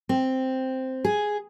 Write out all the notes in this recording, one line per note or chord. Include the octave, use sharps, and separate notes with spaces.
C4
G#4